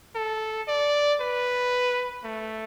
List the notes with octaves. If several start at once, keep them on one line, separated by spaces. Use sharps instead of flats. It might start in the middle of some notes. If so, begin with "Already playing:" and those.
A4
D5
B4
A3